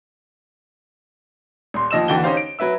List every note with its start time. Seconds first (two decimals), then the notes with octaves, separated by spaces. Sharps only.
1.74 D#1 C6
1.91 D#2 F3 D#5 E6 E7
2.08 D#2 D3 E3 F#4 G5 G7
2.24 C#4 D#4 G4 C5 F5
2.37 D7
2.59 F#3 B4 E5 E6